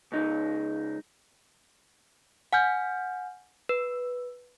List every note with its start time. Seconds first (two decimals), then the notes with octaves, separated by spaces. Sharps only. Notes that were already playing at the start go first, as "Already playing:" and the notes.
0.12 C#2 D#4
2.53 F#5 G#5 F6 G6
3.69 B4